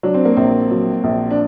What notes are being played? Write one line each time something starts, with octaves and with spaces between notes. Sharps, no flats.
F#3 D4
C4
A#3
A#1 C4
F#3
A#1
D4